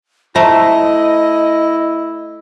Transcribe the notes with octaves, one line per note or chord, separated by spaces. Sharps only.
A3 E4 C5 D#5 A#5